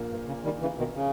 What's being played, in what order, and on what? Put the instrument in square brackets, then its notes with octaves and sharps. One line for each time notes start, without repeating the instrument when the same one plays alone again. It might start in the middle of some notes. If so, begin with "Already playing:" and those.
Already playing: [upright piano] A#1 A#2 A#3
[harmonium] G2
C#3
D#3 G3
C#3 E3
B2 D#3
C#3